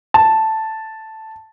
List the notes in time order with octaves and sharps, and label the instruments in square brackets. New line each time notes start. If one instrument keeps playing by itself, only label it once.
[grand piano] A5